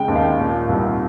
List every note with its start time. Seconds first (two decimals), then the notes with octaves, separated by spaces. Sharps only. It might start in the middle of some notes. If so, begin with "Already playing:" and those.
Already playing: C#3 G#3 G5
0.08 D#2
0.16 F5
0.38 A#2
0.69 C2